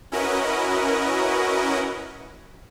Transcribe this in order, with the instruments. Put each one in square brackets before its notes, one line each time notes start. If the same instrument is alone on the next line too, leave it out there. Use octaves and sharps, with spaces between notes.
[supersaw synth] C#4 E4 F#4 A#4 B4 D#5